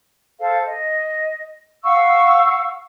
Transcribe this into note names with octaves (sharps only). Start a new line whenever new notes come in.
A4 C5 F5
D#5
F5 F#5 C#6 E6